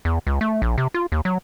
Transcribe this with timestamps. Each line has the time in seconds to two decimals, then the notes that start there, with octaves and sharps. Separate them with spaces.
0.05 E2
0.27 C#2
0.41 A3
0.62 A#1
0.78 C3
0.94 F4
1.12 D#2
1.25 F#3